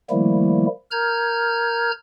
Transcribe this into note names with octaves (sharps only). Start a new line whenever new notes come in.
D#3 F3 G3 A3 A#3 E4
A#4 A#5 F6 G6 G#6